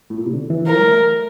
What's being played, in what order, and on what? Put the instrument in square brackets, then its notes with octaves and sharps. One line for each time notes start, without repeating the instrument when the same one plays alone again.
[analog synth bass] A2
A#2
C3
D3
E3
[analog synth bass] F3 [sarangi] A#4
[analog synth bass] G3
A3